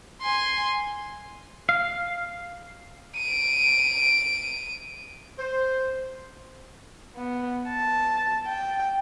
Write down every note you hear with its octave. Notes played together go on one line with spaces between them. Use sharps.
G#5 C6
F5
D7 D#7
C5
B3
A5
G5